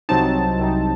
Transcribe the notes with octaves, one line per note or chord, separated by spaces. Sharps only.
C2 C3 F#3 C4 D#4 A5
C2 C3 F#3 C4 D#4